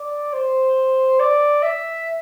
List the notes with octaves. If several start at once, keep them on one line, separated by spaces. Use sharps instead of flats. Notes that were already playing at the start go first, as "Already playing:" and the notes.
Already playing: D5
C5
D5
E5